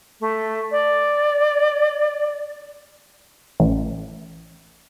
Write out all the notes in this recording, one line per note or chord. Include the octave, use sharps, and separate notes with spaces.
A3
D5
A1